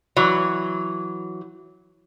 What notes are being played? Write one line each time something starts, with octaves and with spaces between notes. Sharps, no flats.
E3 F#3